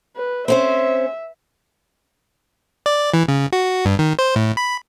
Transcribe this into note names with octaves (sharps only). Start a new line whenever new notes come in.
B4
C4 C#4 C5 E5
D5
E3
C#3
F#4
G2
D#3
C5
A2
B5